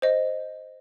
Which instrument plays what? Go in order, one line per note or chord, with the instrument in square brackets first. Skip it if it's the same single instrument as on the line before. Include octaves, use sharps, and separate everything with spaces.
[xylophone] C5 D#5